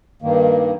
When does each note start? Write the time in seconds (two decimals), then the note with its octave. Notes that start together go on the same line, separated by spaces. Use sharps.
0.22 G2 D#3 A#3